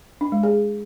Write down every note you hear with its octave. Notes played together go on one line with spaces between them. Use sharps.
D4
G#3
G#4